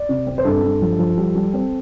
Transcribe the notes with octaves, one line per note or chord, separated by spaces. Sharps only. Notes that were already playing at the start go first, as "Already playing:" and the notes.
Already playing: D5
C3
C4
C5
G2 A4
G2
F3
F3
G3
G3
C4